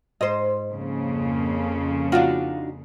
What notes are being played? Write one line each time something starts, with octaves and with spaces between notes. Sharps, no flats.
G#2 C5 D#5
F2 C#3 A#3
D4 D#4 F4 F#4 F5